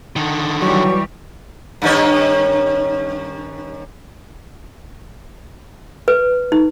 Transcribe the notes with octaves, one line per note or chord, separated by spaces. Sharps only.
D3 D#3
E3 F#3 G3 G4 C#6
G2 D#3 C#4
B4
D#4